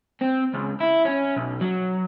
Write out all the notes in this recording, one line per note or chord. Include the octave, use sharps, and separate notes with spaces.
C4
C#2
E4
C#4
B1
F#3